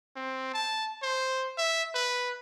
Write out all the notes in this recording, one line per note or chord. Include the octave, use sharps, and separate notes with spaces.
C4
A5
C5
E5
B4